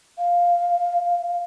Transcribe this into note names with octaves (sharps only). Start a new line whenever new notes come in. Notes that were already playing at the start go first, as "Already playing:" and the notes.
F5